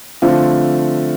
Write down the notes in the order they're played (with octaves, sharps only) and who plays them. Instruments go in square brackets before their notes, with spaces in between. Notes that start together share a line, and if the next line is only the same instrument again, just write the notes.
[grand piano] D3 F3 A3 C4 F4